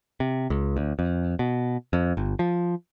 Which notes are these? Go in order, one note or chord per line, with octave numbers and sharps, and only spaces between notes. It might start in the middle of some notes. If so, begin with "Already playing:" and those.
C3
C#2
D2
F2
B2
F2
G1
F3